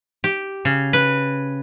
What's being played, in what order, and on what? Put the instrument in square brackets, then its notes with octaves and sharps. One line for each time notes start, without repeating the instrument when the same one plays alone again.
[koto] G4
C#3
B4